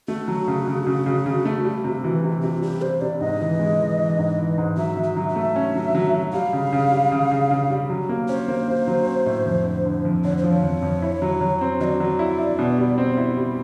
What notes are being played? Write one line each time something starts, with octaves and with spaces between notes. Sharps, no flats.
A3 F#4
F#3
C#3
C#3
C#3
C#3
C#3
A3
G3
C3
E3
C3
C3 F4
G3 G4
G3 C5
C3 D5
G#2 D#5
E3
G#3
E3
E3
G#2
E3
G#2
F#3 E5
F#3
E5
F#3
E5
A3
C#4
F#3
F#3
F#3
G3 F5
C#3
C#3
G3
C#3
C#3
C#3
G3
F#3
A#3
C#4 C5
A#3
A#3
F#3
C#4
A2
F2
D3
D3
F2
D3 C#5
C5
F3
C#5
F2
F2
E4
F#3
F#3
C4
F#3 D5 D#5
F#3
E4
E4
B2
G3
C4
E4
G3